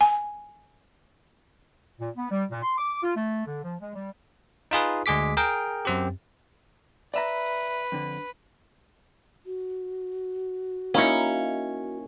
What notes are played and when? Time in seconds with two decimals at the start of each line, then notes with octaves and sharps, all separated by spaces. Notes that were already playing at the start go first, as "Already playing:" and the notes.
0.01 G#5
2.00 A#2
2.16 B3
2.31 G3
2.51 A#2
2.62 C6
2.78 D6
3.03 F4
3.16 A3
3.46 D3
3.63 F3
3.81 G#3
3.95 G3
4.71 D#4 F4 G#4 B4
5.06 D2 G#3 G#4 D6 B6
5.37 G#4 A#4 G5
5.85 F#2 C4 G4
7.14 B4 D5 E5 A#5
7.92 F2 D3
9.46 F#4
10.94 A#3 C#4 D#4 E4 C#5